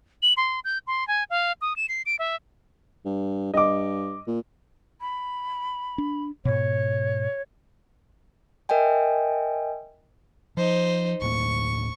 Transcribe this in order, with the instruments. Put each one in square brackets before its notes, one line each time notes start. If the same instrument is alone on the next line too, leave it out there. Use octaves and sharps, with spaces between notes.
[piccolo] F#7
C6
G6
C6
G#5
F5
D#6
E7
C7
D7
E5
[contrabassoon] G2
[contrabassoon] G2 [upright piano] D#5 D6
[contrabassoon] A#2
[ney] B5
[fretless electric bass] D4
[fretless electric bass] G#2 B2 [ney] C#5
[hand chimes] A#4 D#5 E5 G5 G#5
[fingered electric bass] F3 [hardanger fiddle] D#4 C5
[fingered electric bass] D1 A2 A#3 [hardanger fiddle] C#6